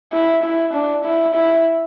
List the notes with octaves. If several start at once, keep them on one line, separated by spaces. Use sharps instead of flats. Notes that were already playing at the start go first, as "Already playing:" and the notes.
E4
E4
D4
E4
E4